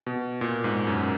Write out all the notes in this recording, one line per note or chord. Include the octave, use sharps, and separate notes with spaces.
B2
A#2
G#2
F#2